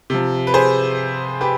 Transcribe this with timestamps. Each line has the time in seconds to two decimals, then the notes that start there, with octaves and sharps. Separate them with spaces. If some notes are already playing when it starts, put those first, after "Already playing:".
0.10 C3 F3
0.47 B4
0.54 G#4 C5
1.41 G4 B4